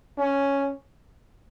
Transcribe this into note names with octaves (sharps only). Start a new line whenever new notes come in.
C#4